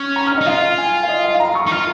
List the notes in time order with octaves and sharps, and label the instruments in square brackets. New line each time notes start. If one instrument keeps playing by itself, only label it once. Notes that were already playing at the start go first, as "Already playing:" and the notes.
Already playing: [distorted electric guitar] C#4 [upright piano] C#6
[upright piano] A#5
F6
D#5
[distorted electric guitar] D#4
[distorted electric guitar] F4 [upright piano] F5
[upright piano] G#5
F5
D#5
F5
A#5
C#6
[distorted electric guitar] D#4
[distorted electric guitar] F4 [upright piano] F6